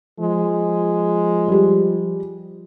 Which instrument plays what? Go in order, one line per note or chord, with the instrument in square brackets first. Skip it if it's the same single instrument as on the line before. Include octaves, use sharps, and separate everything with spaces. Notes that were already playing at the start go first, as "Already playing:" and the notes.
[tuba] F3 [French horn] G#3
[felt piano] G3 G4